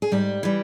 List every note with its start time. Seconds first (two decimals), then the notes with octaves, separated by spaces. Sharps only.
0.02 G#4
0.11 G#2 G3 G4
0.43 E3 G3